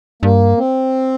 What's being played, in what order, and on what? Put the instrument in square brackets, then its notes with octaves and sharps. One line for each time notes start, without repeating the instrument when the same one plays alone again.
[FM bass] G2 [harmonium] A#3
[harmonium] C4